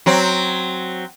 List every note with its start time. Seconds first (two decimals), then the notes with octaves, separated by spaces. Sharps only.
0.06 F#3 C4